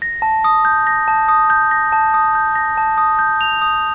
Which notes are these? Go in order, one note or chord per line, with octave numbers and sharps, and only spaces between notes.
A#6
A5
D#6
G6
A#6
A5
D#6
G6
A#6
A5
D#6
G6
A#6
A5
D#6
G6
F7
D#6